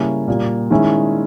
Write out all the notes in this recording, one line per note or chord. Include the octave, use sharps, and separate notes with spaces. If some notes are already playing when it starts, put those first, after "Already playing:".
Already playing: C#3 G3 A#3 C#4 E4
A#2 G3 A#3
D#3 G#3 C#4 E4